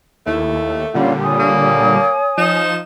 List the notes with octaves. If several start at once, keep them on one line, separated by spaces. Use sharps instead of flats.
D#2 A3 E4
A#2 D3 G3 C#4 F4 F#5
C#5 G#5 D#6
A#3
F3 D#4 E7